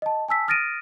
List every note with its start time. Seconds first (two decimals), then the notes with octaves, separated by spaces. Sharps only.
0.02 D#5 A5
0.28 G#5 A5 E6 B6
0.48 D#6 F6 A6 A#6 D7 D#7